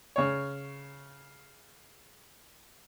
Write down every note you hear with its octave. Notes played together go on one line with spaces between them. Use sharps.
C#3 C#5